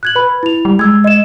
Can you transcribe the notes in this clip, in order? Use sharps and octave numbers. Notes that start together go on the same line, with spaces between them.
F#6 G#6 F#7
B4 B5
E4 F7
G3
G#3 E6 G#6
D#5 E7